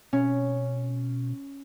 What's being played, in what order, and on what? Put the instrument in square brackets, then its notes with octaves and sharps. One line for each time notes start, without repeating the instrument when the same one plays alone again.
[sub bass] B2 [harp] C#4